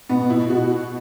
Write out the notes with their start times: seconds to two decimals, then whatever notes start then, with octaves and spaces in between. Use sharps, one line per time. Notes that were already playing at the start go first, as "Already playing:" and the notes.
0.09 B2 B3
0.30 B2 E4
0.50 B2 F#4